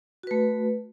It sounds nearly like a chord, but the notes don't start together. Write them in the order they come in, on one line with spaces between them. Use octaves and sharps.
F#4 B4 A3